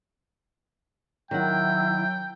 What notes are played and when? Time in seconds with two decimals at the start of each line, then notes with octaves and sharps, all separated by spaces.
1.31 D#3 F#3 E4 F#5 G5